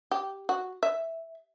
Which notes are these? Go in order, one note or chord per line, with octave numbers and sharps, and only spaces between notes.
G4
F#4
E5